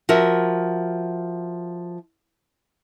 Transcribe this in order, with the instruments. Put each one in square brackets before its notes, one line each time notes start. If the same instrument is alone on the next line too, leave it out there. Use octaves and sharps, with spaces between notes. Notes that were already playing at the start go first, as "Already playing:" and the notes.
[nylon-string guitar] F3 F#4 A#4 E5